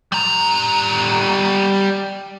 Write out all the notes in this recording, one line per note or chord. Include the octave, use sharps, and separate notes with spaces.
G3 A#5